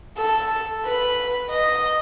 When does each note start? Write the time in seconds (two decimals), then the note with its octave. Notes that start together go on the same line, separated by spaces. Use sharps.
0.17 A4
0.85 B4
1.50 D#5